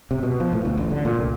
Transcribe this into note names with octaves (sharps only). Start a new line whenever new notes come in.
C3
B2
F3
A2
D2
A1
D3
A#2
C2